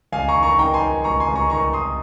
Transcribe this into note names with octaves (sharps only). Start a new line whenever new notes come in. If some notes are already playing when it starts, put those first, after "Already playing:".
C#2 F5 G#5
A#5 C#6
D#3
A#5 C#6
D#3 G5 A#5
G#5 C6
D#3
C#2 A#5 C#6
G#5 C6
C#2
A#5 C#6
D#3 A#5 C#6
D#3 C6 D#6